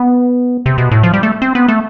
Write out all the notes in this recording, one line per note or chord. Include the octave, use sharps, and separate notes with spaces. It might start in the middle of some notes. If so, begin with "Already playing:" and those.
Already playing: B3
C3
B2
A2
F3
G3
A3
C4
B3
A3